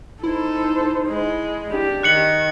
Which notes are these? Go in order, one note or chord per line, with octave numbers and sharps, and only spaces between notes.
D#4 E4 A4 C5
G#3
D4 G4
D#3 F#6 C#7 F#7